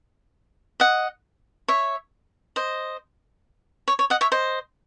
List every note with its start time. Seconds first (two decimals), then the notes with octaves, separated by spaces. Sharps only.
0.80 D#5 F#5
1.68 C#5 E5
2.56 C5 D#5
3.88 C#5
3.99 C#5
4.10 D#5 F#5
4.21 C#5 E5
4.32 C5 D#5